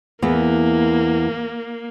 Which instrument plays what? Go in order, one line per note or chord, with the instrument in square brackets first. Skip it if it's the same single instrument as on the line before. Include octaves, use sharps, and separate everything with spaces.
[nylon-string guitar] E2 B3 [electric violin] A#3